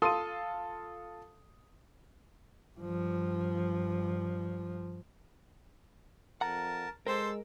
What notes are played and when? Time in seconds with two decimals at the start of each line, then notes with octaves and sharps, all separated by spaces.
0.02 F4 A4 C6 D#6 D#7
2.77 G2 F3
6.41 F2 A#4 F#5 A5 A#5
7.07 G#3 A4 A#4 C5 E6